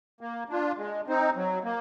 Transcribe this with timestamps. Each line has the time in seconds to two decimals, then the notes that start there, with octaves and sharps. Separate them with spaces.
0.21 A#3
0.49 D4 F4
0.78 G#3
1.07 C4 D#4
1.36 F#3
1.64 A#3